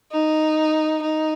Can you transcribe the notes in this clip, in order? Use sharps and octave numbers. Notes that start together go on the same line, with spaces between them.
D#4
D#4